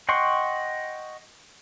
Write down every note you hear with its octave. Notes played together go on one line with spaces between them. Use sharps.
D#5 F#5 G5 C6 C#6